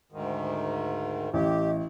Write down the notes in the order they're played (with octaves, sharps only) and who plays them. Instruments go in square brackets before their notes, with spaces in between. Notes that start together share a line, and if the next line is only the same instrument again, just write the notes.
[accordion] D2 G#2 D#3
[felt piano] A1 [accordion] G4 [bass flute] D#5